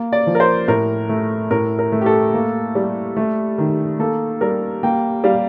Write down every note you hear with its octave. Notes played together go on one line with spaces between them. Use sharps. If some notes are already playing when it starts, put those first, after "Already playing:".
Already playing: A#3
D5
F3
A#4
C5
A2 A#4
A3
A2 A#4
A#4
A3
G4
A4
A#3
G3
A3
D#3
A#3 A4
G3 A#4
A#3 G5
G3 F5